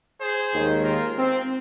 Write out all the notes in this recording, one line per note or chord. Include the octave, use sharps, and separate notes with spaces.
G#4 C5
D#2 D#3 G#3
F4 A#4
C4